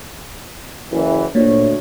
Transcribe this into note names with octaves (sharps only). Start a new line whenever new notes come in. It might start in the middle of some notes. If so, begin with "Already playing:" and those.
F#1 E3
D2 A#2 D4 C#5